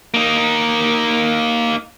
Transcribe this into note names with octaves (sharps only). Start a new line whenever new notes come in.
A#3 D#4